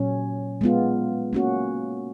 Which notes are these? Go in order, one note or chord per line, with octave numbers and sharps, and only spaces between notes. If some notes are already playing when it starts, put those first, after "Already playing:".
Already playing: A#2 F#3 C#4
G#3 B3 F4
A#3 C#4 F#4